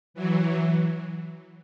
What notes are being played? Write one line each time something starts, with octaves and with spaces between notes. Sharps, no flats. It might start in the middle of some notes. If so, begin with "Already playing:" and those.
E3 F#3